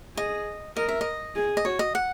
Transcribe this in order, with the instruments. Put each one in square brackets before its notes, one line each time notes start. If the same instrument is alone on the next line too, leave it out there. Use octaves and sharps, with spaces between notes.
[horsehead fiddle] G#4 [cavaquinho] D#5
[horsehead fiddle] A#4 [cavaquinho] D#5
[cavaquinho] E5
D#5
[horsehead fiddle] G#4
[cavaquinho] D#5
[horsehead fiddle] F#4 [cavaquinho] C#5
[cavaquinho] D#5
F#5